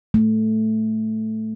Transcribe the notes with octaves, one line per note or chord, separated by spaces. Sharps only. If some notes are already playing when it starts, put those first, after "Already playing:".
A3